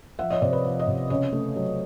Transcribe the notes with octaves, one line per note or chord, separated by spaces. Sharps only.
F3 E5 F#5
C#5 D#5
C3 C5 D5
B4 C#5
F3
C#5 D#5
C3
C#3 C#5 D#5
A3
F#3